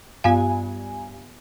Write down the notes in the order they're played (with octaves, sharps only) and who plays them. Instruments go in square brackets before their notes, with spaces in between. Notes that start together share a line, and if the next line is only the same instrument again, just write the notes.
[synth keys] G2 G#5 [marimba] B3 F4 F5